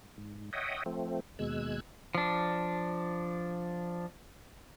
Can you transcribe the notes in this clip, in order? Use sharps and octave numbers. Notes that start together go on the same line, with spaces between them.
G#2
C#5 D#5 E5 F#5 G5 D#6
F3 A3 C4
D#2 B2 G#3 E6 F#6 G#6
F3 D4